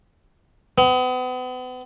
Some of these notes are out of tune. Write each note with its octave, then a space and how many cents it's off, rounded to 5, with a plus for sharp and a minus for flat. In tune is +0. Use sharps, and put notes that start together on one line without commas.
B3 +40